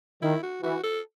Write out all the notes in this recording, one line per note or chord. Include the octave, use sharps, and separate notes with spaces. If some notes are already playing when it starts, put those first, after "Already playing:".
D#3 E4
F#4
E3 F#4
A4